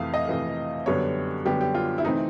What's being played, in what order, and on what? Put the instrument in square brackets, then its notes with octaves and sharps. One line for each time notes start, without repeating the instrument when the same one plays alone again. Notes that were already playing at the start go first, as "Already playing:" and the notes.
Already playing: [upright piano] F2 C3 E3 A3 F5
D#5
F2 C3 E3 A3
F#2 D3 G3 B3 C#5
F#2 D3 G3 B3 G4
G4
F4
E4
C3 E3 A3 C4 D#4